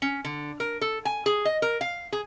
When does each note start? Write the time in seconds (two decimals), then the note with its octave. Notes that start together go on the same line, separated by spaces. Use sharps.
0.02 C#4
0.25 D3
0.60 A#4
0.81 A4
1.05 G#5
1.26 G#4
1.45 D#5
1.62 A#4
1.81 F5
2.13 G#4